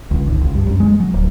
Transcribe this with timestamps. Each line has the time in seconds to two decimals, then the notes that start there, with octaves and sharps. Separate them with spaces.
0.11 C#2
0.27 G#1
0.41 C#2
0.55 G2
0.67 F#2
0.80 G#3
1.00 F#3
1.13 D1